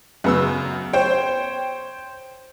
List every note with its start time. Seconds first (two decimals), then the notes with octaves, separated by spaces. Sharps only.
0.24 F#2 C#3 B3 E6
0.93 C5 C#5 G5